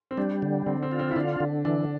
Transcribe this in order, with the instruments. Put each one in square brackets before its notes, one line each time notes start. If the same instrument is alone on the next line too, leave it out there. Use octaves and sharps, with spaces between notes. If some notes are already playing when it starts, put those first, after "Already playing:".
[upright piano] C4
[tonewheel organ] G3 [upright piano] D4
[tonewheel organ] D3
[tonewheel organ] D3 [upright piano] C4
[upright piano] C4
[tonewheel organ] F4
[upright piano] C4
E4
[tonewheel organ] D3 [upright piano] D4
[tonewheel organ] D3
[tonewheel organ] E3 [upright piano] D4